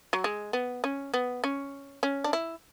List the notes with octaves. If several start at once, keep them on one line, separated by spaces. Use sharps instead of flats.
F#3
G#3
B3
C#4
B3
C#4
C#4
D4
E4